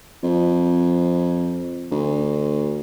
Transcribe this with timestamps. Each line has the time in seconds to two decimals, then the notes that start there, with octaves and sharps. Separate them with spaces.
0.23 F2
1.91 D2